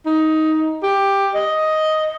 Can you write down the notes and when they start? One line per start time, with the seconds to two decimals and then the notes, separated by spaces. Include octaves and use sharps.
0.06 D#4
0.83 G4
1.35 D#5